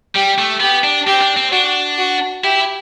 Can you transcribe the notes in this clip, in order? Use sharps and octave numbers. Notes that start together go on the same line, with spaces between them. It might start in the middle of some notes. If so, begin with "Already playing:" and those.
G3 G4
A3
B3 G4
D4
C4 G4
D4
C4
D4 F#4
F#4
E4 G4